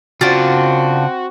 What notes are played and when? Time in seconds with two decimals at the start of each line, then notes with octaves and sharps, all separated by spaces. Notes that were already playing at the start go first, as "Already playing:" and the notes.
0.21 C#3 C4 D4 F4 F#4 F#5